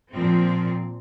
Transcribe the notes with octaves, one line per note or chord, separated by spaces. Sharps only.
A#2 F3 C4